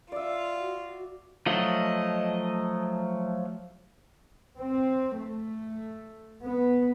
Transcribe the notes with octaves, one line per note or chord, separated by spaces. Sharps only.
F4 D5 E5
F#4
F3 F#3 A3 D#5
C4
A3
B3